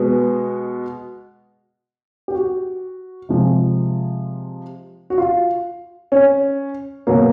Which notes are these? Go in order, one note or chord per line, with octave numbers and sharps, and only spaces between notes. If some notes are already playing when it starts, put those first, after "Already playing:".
Already playing: B2 G#3 B3
G4
F#4
C3 F3 G#3
F#4
F4
C#4
B2 F#3 A#3